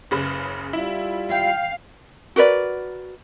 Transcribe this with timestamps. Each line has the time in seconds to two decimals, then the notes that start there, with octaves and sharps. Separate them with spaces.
0.11 F#1 C#3 B4 B5
0.73 G3 E4 F4
1.31 F5 G5
2.36 F#4 A#4 B4 D5